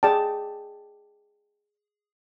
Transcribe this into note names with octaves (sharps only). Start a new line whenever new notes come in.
G#4 D5 G5 A5